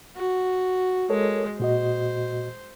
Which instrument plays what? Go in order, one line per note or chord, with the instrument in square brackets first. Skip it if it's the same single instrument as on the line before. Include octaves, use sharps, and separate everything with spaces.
[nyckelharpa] F#4
[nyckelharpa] G#3 [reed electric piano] A4 A#4 C#5
[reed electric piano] A#2 F#4 D#5 [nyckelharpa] C5